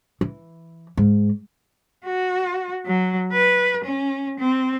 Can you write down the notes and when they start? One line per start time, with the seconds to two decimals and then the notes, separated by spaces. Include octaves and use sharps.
0.21 E3
0.97 G#2
2.06 F#4
2.86 F#3
3.33 B4
3.85 C#4
4.40 C4